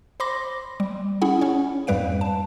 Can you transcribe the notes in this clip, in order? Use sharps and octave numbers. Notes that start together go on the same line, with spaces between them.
C5 B5 C6 D6 A#6
G3
C#4 E4 G#4 F#5
C#4 C#5
F2 G#2 G3 B4 F5 D7
A5